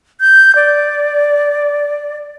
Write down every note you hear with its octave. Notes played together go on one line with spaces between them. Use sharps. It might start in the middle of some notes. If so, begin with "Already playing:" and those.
G6
D5